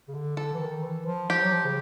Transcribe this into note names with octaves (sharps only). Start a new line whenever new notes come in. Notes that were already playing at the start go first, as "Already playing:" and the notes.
C#3
D3
D3 A4
E3
D#3
E3
F3
F3 G4
F#3
F3
C#3